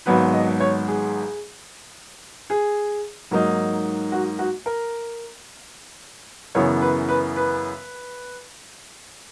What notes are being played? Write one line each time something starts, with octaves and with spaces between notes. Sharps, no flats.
G#1 G#2 F#3 B3 B4
D#5
C#5
G#4
G#4
G#2 F#3 A#3 D#4
F#4
F#4
A#4
F#2 C#3 E3 B3 C#5
B4
B4
B4